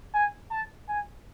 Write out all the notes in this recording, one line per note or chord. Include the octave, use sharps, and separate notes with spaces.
G#5
A5
G#5